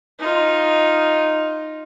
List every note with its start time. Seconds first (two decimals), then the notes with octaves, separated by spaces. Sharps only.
0.19 D#4 F4